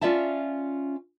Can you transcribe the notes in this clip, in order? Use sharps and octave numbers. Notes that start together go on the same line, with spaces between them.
C#4 D#4 F4 D5 E5 A5